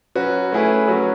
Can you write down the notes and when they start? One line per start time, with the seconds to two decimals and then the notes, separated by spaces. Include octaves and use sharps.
0.16 F#3 C#4 F#4 B4
0.52 A3 C#4 E4 G#4 B4
0.88 F#3 C#4 F#4 B4